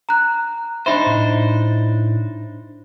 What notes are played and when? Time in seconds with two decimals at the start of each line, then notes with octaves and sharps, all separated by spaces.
0.09 A#5 F#6
0.86 D4 D#4 C5 E5 B5
1.06 A2